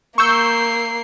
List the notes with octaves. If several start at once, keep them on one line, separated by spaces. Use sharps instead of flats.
A#3 C#6 E6 G6 C7